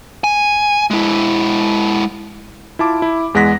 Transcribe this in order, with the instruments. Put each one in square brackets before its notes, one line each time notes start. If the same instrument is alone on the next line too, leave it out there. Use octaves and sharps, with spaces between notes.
[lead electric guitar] G#5
G#3 E4
[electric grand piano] E4 F4 A5 D6
E4
E2 G#3 F#5 A#6 B6